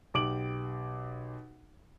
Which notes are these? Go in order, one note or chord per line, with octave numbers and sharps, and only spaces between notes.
B1 G4 D6 D7 F#7